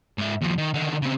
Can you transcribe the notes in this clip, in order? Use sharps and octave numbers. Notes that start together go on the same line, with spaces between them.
G#2 E5
D#2 F3
D#3
D3 D#3
C#3 C4